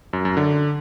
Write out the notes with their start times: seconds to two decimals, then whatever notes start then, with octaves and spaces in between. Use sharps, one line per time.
0.13 F#2
0.25 F#2
0.37 D3